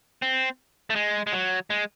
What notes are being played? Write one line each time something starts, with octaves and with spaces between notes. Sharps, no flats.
C4
A3
G#3
G#3
F#3
G#3